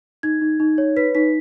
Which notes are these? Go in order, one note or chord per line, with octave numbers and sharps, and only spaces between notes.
D#4 G#6
D#4
D#4
C#5
B4 B6
D#4 B6